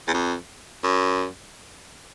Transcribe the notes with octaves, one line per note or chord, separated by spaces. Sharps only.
E2
F2
F#2